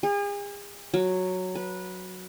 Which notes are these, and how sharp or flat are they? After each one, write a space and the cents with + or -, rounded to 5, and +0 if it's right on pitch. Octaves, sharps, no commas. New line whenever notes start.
G#4 -40
F#3 -5
B4 -20